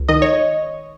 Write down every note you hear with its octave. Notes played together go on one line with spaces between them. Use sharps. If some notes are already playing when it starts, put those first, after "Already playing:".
Already playing: C#2
D#3 D#5
C#5